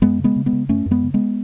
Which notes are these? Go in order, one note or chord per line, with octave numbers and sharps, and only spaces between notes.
F#2 G#3 B3
C#3
G#3 B3
C#3
G#3 B3
C#3
F#2 A3 C#4
F#2
G#3 B3
C#3
G#3 B3